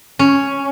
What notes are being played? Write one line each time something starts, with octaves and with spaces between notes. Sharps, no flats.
C#4